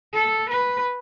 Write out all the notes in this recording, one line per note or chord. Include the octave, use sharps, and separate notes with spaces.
A4
B4